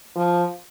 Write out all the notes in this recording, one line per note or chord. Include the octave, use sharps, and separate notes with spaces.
F3